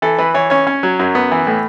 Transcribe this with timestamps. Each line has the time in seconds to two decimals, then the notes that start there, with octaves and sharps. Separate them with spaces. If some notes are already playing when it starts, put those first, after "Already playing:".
0.02 E3 A4
0.19 E3 B4
0.34 E3 C#5
0.50 C#4 C#5
0.67 C#4
0.83 F#3
0.99 F#2
1.15 B3
1.32 E3
1.47 A2